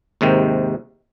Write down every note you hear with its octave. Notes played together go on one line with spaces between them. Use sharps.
D#2 G#2 C3 D#3